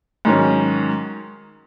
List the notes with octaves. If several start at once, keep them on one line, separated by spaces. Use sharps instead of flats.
G#2 D#3 F#3 C#4